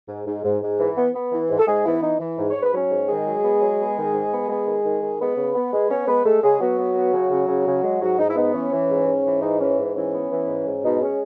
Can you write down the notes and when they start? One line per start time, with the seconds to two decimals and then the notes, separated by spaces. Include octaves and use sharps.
0.09 G#2
0.26 G#2
0.44 G#2
0.61 G#2
0.79 E3
0.96 B3
1.14 B3
1.32 E3
1.49 G#2
1.59 A4
1.67 G#2 G#3 G#4
1.84 E3 B3 E4
2.02 E3 D#4
2.20 E3
2.38 G#2
2.50 G#2 C#5
2.63 B4
2.73 F#3 C#4 C#5
2.90 G#2
3.08 D#3 G#3 G#4
3.26 F#3
3.43 B3
3.61 F#3
3.79 B3
3.96 D#3
4.14 G#2
4.31 B3
4.48 G#3 B3 G#4
4.67 D#3
4.84 D#3
5.01 D#3
5.19 G#3 B3 B4
5.37 C#3
5.55 B3
5.72 G#3
5.90 B3 C#4 C#5
6.07 G#3 B3 B4
6.25 G#3 A3 A4
6.43 C#3 G#3 G#4
6.60 F#3 B3 F#4
6.78 B3
6.95 B3
7.13 C#3
7.31 C#3
7.49 C#3
7.66 C#3
7.83 G#3
8.01 G#2 F#3 F#4
8.18 G#2 D#4
8.29 E4
8.36 B3 D#4
8.54 E3 C#4
8.72 E3
8.89 G#2
9.06 G#2
9.24 E3
9.42 G#2 D#4
9.60 E3 C#4
9.78 G#2
9.95 E3 C#4
10.13 B3
10.30 E3
10.47 G#2
10.66 G#2
10.83 B2 D#4
11.01 G#3 C#4